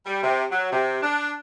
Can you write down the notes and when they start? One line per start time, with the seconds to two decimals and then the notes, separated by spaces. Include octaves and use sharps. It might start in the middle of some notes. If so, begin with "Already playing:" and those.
0.05 G3
0.23 C3
0.50 F#3
0.72 C3
1.02 D4